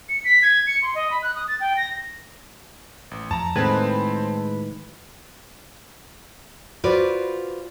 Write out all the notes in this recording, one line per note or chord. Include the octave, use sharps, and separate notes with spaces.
C#7
B6
G#6
C#7
C6
D#5
B5
F#6
D#6
A6
G5
A#6
A1
F2 A5 A#5
A2 D#3 G#3 C4 B4 A5 G#6
F4 F#4 B4 C5 D5